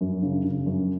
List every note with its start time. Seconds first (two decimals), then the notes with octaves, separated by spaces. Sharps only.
0.01 F#2
0.22 C#3
0.45 C#3
0.66 F#2